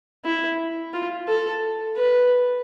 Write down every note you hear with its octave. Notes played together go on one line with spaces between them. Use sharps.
E4
F4
A4
B4